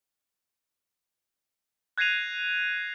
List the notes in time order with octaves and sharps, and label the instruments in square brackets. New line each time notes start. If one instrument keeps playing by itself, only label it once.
[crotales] F#6 G#6 A#6 C7 D#7 F7